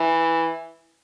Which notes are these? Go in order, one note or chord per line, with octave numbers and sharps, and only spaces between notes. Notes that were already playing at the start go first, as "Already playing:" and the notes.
Already playing: E3